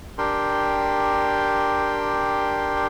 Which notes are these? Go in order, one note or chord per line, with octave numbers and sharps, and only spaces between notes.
D4 G4 A#4 G5 C6